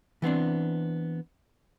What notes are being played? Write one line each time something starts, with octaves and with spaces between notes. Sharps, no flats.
E3 B3 C4 D4